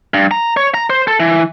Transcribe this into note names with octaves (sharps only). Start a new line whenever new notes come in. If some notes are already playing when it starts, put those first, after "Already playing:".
G2
A#5
C#5
A#5
C5
A4
E3